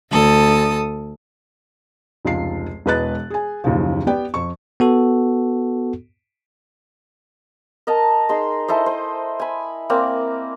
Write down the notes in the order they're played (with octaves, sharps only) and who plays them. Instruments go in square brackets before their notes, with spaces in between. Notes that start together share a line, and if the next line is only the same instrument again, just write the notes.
[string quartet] D2 A4 D#6
[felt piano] F1 C#2 F4 C7
E1 G#3 B4 D#5 F#6 A6
G#4 G#5
F#1 D#2 C#3 F3
B3 G4 B4 D5 G5
F2 C#6
[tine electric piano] B3 F#4 A4
[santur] A#4 D#5 A5 A#5
D#4 G#4 C6
E4 A4 C5 D#5
C5
G#5 B5
A#3 C4 A#4 D5